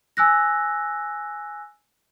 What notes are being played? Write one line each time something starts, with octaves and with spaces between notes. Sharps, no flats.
G#5 E6 F#6 A#6